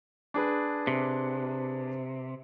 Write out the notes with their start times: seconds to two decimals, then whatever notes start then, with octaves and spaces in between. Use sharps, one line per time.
0.34 D4 G#4 B4
0.87 C3